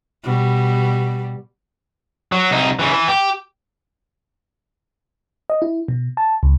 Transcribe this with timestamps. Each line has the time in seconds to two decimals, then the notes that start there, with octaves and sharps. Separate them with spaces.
0.24 B2 G3
2.32 F#3
2.51 C2 D#4
2.79 C#3 E3
2.93 E3
3.08 G4
5.50 D#5
5.62 E4
5.88 B2
6.17 A5
6.43 C#2